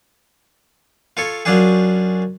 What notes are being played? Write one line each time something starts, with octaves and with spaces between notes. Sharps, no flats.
F4 A4 C#5
F#2 F#3 C#4 D4 F4 G#4